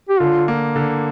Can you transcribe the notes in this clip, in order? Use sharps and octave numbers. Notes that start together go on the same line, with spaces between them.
G4
D3 F4
A#3
D3